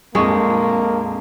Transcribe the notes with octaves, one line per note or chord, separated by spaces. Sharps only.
A#1 F2 G#3 A#3 D#5 C#6